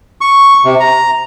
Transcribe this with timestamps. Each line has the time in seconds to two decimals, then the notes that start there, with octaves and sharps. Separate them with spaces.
0.21 C#6
0.65 C3
0.80 A#5